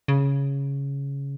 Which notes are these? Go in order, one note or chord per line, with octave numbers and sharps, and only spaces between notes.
C#3